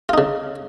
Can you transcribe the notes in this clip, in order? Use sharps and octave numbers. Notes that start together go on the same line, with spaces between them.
C#3 D#4 F4